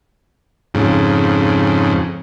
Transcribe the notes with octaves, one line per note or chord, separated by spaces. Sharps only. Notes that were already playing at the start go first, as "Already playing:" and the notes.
F2 G#2 C#3